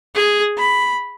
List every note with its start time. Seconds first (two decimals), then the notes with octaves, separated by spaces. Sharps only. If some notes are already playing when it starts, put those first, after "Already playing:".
0.15 G#4
0.58 B5